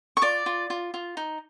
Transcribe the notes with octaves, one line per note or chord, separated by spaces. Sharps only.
C#6
F4 D5 D6
F4
F4
F4
D#4